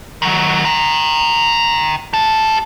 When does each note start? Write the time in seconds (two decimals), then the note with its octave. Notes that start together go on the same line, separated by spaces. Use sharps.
0.22 D#3 F#3
0.65 G5 A#5
2.14 G4 A5